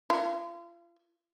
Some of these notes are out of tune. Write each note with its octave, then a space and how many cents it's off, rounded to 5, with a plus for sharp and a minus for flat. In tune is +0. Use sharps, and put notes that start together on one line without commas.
F4 -35